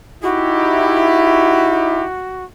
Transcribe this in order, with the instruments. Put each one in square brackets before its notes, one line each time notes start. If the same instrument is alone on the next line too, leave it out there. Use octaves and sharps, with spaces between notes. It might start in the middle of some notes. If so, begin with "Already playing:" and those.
[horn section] D#4 E4 G4 [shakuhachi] F#4